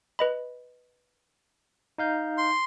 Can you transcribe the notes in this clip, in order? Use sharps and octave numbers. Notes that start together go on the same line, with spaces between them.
B4 D#5 B5
D#4 F5 G6
C6